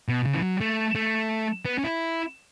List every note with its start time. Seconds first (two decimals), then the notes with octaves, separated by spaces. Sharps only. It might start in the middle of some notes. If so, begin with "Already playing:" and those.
0.08 B2
0.25 C#3
0.34 E3
0.42 F#3
0.61 A3
0.95 A3
1.65 B3
1.78 C#4
1.84 E4